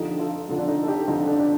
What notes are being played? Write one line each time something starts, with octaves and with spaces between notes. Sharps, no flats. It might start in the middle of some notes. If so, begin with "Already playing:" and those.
Already playing: F2 D3 F3 D#4 G4
F4 A4
F2 D3 F3
D4
D#4
A4
D#4 G4
F2 D3 F3 D#4
D4
D4